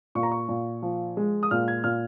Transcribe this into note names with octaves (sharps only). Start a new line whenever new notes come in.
A#2 C#6
A#5
C#6
A#2
F3
G#3
D#6
A#2 F6
G#6
A#2 F6